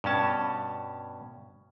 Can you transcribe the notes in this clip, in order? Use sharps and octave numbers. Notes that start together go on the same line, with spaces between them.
G2 B2 C#4 A5